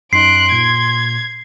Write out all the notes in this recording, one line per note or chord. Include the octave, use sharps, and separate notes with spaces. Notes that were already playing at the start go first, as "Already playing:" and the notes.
F#2 D#4 C6 F#6 C7 D7
A#2 G#6